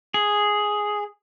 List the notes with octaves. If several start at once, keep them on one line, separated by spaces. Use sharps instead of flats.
G#4